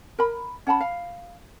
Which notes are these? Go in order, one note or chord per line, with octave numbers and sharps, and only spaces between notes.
A#4 B5
C#4 F#5 A5 B5
F5